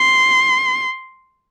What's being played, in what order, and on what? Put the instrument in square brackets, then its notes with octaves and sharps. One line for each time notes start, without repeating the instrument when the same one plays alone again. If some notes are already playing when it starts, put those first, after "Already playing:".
Already playing: [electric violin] C6